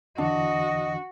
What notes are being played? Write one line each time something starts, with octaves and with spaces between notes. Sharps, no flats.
E2 D3 E3 D4 F#4 D#5